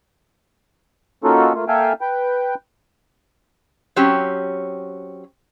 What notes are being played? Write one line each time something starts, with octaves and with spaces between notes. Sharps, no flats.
A#3 C#4 D#4 F4 F#4 A4
A3 A#3 F4
A#3 A4 E5 F5 G5 G#5
B4 G5
F#3 C4 C#4 G4